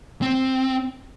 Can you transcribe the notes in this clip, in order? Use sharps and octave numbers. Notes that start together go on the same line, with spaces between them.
C4